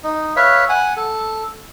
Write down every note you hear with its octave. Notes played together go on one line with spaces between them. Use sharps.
D#4
B4 C#5 E5 F5
F#5 G#5
A4